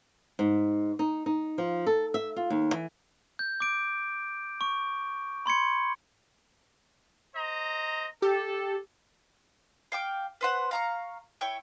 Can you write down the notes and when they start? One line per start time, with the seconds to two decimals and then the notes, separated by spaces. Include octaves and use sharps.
0.39 G#2
0.99 D#4
1.26 D#4
1.58 F3
1.87 A4
2.14 E5
2.36 F4
2.50 D#2
2.74 E3
3.39 G6
3.60 D6 D7
4.61 C#6
5.46 B5 C6 G#6 C#7
7.35 C5 D#5 A#5
8.22 G4 A4
9.92 F5 G5 D6
10.41 B4 C5 F#5
10.71 F5 A#5 C#6
11.41 E4 C#5 G5